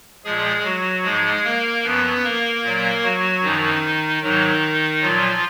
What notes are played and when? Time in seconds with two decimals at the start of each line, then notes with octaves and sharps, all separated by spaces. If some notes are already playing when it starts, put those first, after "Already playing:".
0.24 A#2 F3 G#3 G#4
0.64 F#3 F#4
1.04 G#2 F3 G#3 G#4
1.44 A#3 A#4
1.84 F#2 F3 B3 B4
2.23 A#3 A#4
2.63 A#2 F#3
3.03 F#3 F#4
3.43 F#2 D#3 F3 D#4
4.22 G#2 D#3 F#3 D#4
5.02 A#2 F3 F#3 F4